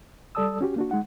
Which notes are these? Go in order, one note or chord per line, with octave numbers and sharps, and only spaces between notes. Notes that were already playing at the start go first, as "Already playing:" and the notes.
G3 A4 D5 A5 D#6 E6
C#4 F#4 G4
A#3 D4 F#4
G#3 D#4 F#5